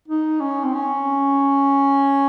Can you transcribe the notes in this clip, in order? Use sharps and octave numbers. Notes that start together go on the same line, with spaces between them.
D#4
C#4
C4
C#4